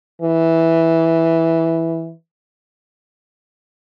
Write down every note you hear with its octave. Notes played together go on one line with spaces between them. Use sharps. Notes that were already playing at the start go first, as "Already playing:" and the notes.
E3